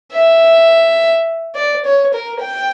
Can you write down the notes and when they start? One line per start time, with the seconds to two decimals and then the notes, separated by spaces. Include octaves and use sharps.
0.13 E5
1.55 D5
1.85 C#5
2.13 A#4
2.41 G5